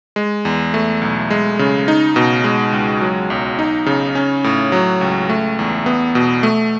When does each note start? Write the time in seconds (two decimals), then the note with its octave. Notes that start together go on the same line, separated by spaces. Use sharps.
0.16 G#3
0.45 E2
0.74 A3
1.02 B1
1.30 G#3
1.59 C#3
1.88 D#4
2.16 B2
2.44 G#3
2.72 C#2
3.01 F#3
3.30 B1
3.59 D#4
3.86 C#3
4.15 C#4
4.44 A2
4.72 F#3
5.01 C#2
5.29 A3
5.59 E2
5.86 B3
6.15 B2
6.43 A3